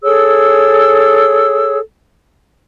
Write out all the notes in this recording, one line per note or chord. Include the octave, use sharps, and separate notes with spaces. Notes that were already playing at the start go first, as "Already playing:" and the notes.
G#4 A4 C#5 E6